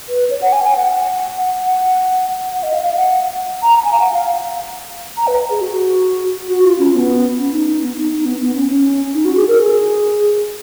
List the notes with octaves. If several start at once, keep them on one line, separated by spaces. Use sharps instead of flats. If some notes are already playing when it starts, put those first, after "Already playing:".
B4
C#5
F#5
G#5
G#5
F#5
F#5
F#5
D#5
F5
F5
F#5
A#5
A#5
G#5
F5
F#5
F5
A#5
B4
G#4
F#4
F#4
F4
C#4
B3
C#4
D#4
D#4
B3
D#4
D#4
B3
B3
C#4
C#4
D#4
F#4
G#4
A#4
G#4